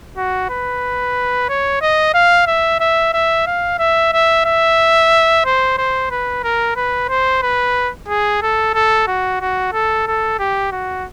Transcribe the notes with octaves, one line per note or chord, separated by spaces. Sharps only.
F#4
B4
C#5
D#5
F5
E5
E5
E5
F5
E5
E5
E5
C5
C5
B4
A#4
B4
C5
B4
G#4
A4
A4
F#4
F#4
A4
A4
G4
F#4